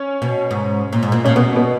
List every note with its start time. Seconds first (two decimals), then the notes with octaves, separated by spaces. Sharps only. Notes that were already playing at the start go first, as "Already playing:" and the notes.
Already playing: C#4
0.22 B2
0.51 G#2
0.93 A#2
1.03 G#2
1.12 A#2
1.25 A#2 C#4
1.36 B2 B3
1.56 B3